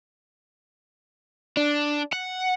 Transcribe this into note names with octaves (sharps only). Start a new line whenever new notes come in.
D4
F#5